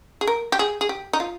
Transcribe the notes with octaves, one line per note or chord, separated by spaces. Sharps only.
G#4
A#4
G4
G#4
G#4
G4
D#4
F4